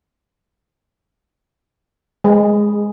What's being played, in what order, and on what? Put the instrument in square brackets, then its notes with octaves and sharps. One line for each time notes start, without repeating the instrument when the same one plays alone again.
[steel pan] G#3